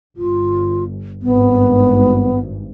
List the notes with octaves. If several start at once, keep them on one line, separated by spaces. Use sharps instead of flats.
G1 F4
G#1 G2 B3